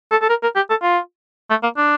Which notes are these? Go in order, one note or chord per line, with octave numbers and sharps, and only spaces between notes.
A4
A4
A#4
A#4
G4
A4
F4
A3
A#3
D4